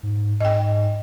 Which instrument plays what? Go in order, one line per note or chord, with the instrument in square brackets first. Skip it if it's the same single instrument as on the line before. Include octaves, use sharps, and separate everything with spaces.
[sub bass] G#2
[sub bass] G#2 [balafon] D#5 G5